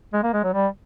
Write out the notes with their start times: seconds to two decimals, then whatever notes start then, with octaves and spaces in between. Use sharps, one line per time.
0.13 G#3
0.23 A#3
0.33 G#3
0.43 F#3
0.54 G3